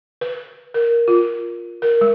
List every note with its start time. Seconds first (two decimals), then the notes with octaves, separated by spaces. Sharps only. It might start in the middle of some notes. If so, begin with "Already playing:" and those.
0.21 B4
0.74 A#4
1.08 F4
1.82 A#4
2.01 G#3